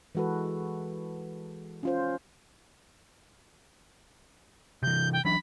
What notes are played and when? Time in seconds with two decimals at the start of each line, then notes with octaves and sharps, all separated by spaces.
0.15 E3 G#3 F#4 A4 B4
1.83 C#4 F4 C5
4.83 C3 E3 G6
5.13 G5
5.25 E3 F#3 D4 B5